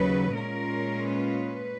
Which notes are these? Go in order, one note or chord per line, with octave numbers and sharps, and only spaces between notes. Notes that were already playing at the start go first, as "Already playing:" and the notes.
Already playing: D#2 C#3 F#3 B4
A#2 G#3 C#4 F4 A#4
B4